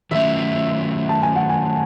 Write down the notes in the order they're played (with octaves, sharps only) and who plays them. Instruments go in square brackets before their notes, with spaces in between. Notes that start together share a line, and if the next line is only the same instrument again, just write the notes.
[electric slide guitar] D#3 F#3 A3 C#4 [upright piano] E5
[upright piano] A5
G#5
F#5
G#5